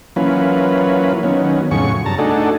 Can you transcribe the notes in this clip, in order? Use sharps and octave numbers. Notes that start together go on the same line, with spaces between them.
E3 F#3 A#3 C#4 F4 B4
D#3 F#3 B3 C#4
F2 A2 C#3 F#3 G#4 C#6
G2 A5 A#5
A3 D4 D#4 F#4 G#4 A4